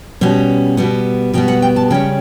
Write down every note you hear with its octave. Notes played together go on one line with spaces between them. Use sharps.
B2 G3 C#4
B2 G3 B3
B2 G3 B3 G5
F#5
G5
A5
C#3 G3 C#4 G5